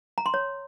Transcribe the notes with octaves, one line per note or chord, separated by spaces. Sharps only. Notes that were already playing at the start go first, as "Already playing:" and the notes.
A#5
C6
C#5